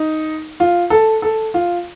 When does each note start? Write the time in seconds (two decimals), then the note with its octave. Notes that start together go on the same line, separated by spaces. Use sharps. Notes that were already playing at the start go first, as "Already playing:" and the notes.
Already playing: D#4
0.60 F4
0.90 A4
1.22 A4
1.54 F4